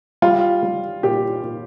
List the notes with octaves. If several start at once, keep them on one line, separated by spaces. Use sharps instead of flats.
G3 F4
G3
A#2 G4
A#2